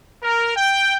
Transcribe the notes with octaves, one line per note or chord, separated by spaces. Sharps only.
A#4
G5